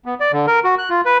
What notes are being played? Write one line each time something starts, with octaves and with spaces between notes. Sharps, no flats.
B3
D5
D3
A#4
F#4
F#6
F4
B4